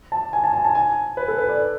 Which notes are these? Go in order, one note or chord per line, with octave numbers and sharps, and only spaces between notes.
A5
G#5
A5
G#5
A5
G#5
B4
A4
B4
D5